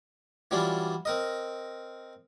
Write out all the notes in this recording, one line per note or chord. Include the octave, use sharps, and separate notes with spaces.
E3 F#3 G3 C#4 D4 F4
C4 A#4 D#5